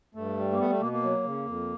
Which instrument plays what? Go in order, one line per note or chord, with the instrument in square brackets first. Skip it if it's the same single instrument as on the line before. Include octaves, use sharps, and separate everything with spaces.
[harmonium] G2 A3
G3
A#3
A3 B3
A3
B2 A#3
A#3
F#3
C#3
F2